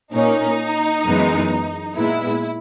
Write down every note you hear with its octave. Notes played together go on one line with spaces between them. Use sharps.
A#2 A#3 C#4 D#4
F#2 E3 G#3 B3
A#2 G#3 B3 E4